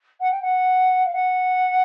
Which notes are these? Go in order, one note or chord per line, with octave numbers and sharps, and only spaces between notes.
F#5
G5
F#5
F5
F#5